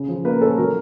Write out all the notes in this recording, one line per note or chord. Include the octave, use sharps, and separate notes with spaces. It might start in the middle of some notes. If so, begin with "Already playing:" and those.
Already playing: C#3
F3
A#3 B4
C#4 A4
F#3 A#4